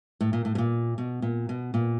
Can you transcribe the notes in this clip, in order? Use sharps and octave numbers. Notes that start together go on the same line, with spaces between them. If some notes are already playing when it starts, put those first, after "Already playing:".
A2
A#2
A2
B2
A#2
B2
A#2
B2
A#2